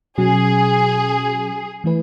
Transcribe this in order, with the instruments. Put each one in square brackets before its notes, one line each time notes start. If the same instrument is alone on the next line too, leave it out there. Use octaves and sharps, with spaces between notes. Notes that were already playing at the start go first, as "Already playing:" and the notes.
[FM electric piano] B2 F#3 C#4 F#4 [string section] G#4
[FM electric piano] E3 A3 E4 B4